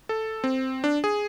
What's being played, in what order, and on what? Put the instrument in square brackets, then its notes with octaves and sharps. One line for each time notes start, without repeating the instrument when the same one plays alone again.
[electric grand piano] A4
C4
D4
G#4